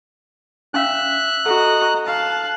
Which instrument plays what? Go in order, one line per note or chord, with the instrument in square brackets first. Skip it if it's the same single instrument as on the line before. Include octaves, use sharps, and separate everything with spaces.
[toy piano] C#4 F5 [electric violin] E5 [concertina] F#6
[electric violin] F#4 [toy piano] A4 [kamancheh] D#5 A#5
[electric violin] F5 [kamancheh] A5 F#6